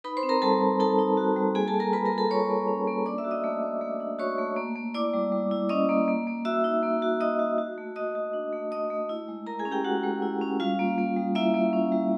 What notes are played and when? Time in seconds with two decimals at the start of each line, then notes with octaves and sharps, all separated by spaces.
0.04 D#4 B4 B5
0.17 C5 C6
0.23 C4
0.29 A#4 A#5
0.42 G3 A4 A5
0.61 G3
0.80 D#4 A4 A5
0.98 D#4
1.17 F#4
1.36 G3
1.55 A#3 G#4 G#5
1.67 A4 A5
1.74 A#3
1.80 A#4 A#5
1.93 F4 B4 B5
2.05 A#4 A#5
2.12 F4
2.18 A4 A5
2.30 A#3 C#5 C#6
2.49 A#3
2.68 C#4
2.87 A#3
3.06 D4 D5 D6
3.18 E5 E6
3.24 F#4
3.31 D#5 D#6
3.44 A3
3.63 A3
3.81 A3
4.00 D4
4.19 F#4 C#5 C#6
4.38 A3
4.56 A#3
4.76 A#3
4.94 E4 D5 D6
5.13 G3
5.32 G3
5.51 E4
5.69 C#4 D#5 D#6
5.89 A#3
6.08 A#3
6.27 A#3
6.45 F#4 E5 E6
6.64 D#4
6.83 A#3
7.02 F#4
7.21 F#4 D#5 D#6
7.39 F#4
7.58 F#4
7.78 A3
7.96 F#4 D#5 D#6
8.15 F#4
8.33 D4
8.53 A3
8.71 A3 D#5 D#6
8.90 A3
9.09 E4
9.28 G#3
9.47 E4 A#4 A#5
9.59 G#4 G#5
9.65 C#4
9.72 G4 G5
9.84 G#3 F#4 F#5
10.03 G#3
10.22 E4
10.41 C#4
10.60 G3 F4 F5
10.79 A#3
10.98 A#3
11.16 G3
11.35 A#3 E4 E5
11.54 A#3
11.73 C#4
11.92 G3